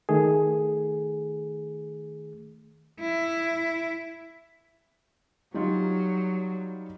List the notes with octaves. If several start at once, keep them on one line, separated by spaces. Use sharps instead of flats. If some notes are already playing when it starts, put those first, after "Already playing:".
D#3 A3 G#4
E4
F#3 G3 D#4 F4